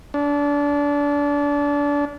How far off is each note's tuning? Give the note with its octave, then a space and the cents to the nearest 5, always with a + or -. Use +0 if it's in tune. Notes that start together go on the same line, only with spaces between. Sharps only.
D4 -25